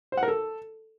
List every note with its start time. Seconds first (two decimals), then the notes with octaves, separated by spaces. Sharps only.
0.12 C5
0.17 F#5
0.23 A#4
0.28 A4